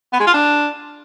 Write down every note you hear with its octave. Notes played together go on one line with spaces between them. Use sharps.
B3
G#3
F4
D4